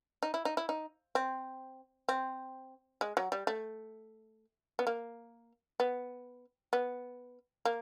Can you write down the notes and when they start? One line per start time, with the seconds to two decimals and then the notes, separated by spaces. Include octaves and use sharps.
0.23 D#4
0.34 E4
0.45 D#4
0.57 E4
0.69 D#4
1.15 C4
2.09 C4
3.01 G#3
3.17 F#3
3.32 G3
3.47 A3
4.79 B3
4.87 A#3
5.80 B3
6.73 B3
7.65 A#3